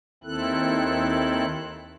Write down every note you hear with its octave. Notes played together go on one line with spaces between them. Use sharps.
D#2 D#3 C4 E4 A4 F#6